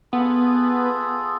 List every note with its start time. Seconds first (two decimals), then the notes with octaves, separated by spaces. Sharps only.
0.13 B3 F4 G#4 A4